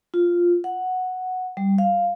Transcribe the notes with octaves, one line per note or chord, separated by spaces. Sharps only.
F4
F#5
G3
F5